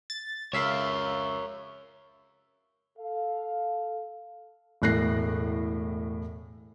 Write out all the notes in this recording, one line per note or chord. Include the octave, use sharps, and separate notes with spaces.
A6
C#2 A#4 C#5 E5 F5
A4 F5
E1 A2 F#6 A#6 C7